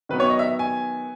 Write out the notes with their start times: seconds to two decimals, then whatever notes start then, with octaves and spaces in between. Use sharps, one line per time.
0.09 D#3 F#3 B3 B4
0.20 C#5
0.30 D#5
0.39 E5
0.59 G#5